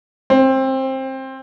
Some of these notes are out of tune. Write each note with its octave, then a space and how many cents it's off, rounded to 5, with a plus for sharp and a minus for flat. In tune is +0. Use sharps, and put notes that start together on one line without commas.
C4 +20